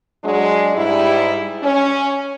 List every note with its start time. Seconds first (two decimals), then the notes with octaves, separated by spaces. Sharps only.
0.24 F#3 G#3 D4
0.76 G#2 G3 E4
1.63 C#4